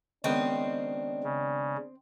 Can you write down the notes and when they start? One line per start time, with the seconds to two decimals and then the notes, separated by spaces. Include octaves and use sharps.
0.24 C#2 D#3 B3 C4 D4
1.24 C#3